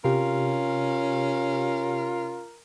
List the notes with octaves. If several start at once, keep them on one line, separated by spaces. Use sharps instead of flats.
C3 C#4 F4 G4 A#4